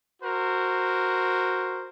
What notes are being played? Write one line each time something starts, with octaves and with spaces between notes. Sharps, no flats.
F#4 A#4 C5